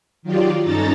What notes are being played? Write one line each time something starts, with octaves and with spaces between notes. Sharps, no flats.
D#3 F#3 F4 G4 D5
G2 C#4 D#4 A4 A#5 A6